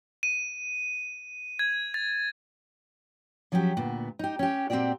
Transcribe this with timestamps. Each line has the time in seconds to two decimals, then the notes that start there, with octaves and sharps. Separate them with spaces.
0.23 D#7
1.59 G#6
1.94 A6
3.52 F3 F#3 C#4 F#4 G4
3.77 D2 A#2 B3
4.19 D#4 G4
4.39 C#4 G4
4.70 A#2 C4 D4 F#4 G4 D5